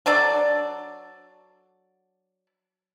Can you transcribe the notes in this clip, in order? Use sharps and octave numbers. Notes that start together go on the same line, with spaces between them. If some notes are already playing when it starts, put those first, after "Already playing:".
F#3 D4 A4 D5